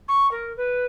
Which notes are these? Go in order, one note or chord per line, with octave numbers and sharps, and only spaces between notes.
C#6
A#4
B4